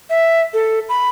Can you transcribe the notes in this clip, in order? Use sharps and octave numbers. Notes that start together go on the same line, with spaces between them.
E5
A4
B5